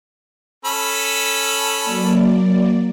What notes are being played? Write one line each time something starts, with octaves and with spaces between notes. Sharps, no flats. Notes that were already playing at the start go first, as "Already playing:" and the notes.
C#4 A4 B5
F#3 A#3 D5